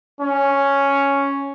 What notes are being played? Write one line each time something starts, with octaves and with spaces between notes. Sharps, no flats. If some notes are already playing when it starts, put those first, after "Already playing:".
C#4